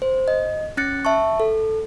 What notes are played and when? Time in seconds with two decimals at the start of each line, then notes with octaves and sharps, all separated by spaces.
0.02 C5
0.28 D#5
0.77 C#4 F#6 A6 C#7
1.05 E5 A5 C#6
1.40 A4